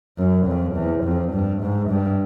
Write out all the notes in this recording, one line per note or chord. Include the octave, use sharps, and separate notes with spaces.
F#2
F2
E2
F2
G2
G#2
G2